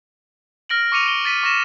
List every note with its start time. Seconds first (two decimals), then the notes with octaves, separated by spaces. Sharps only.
0.69 F6 A#6 D7 F#7
0.92 C#6 D6 C#7 D#7 F7
1.06 D7 G7
1.25 A6 B6 D#7
1.43 C#6 A#6 E7